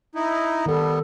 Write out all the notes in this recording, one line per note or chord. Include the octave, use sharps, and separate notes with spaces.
D#4 E4
D#3 G3 B3 A4